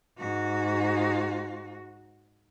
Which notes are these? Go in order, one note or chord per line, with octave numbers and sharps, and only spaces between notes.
G#2 F#4